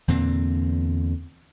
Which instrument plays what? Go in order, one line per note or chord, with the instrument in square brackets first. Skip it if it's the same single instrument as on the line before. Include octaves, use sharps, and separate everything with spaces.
[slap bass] E2 A#2 D3 C4